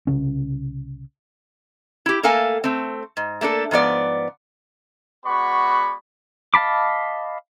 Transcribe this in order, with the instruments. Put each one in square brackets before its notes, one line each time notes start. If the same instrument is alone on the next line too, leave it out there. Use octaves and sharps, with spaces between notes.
[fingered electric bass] C2 C#3 C#4
[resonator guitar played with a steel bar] E4 G4
A3 A#3 A4 A#4 F5 G#5
A3 C4
G#2
A3 A#3 D4 A4
G#2 F3 B3 D5
[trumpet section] G#3 B3 F#4 D5 B5 C#6
[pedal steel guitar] D#5 F5 A5 B5 D6